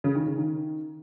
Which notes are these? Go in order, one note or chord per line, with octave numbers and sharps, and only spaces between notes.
C#3
D#3
C#3
D#3